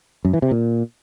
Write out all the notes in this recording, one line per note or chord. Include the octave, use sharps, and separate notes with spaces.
F#2
E3
C3
A#2